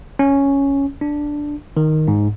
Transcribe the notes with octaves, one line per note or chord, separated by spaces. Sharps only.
C#4
D4
D#3
G#2